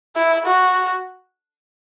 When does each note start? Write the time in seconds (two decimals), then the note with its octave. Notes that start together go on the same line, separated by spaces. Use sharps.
0.16 E4
0.46 F#4